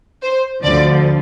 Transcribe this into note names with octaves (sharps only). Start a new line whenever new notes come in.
C5
D2 D3 F3 D5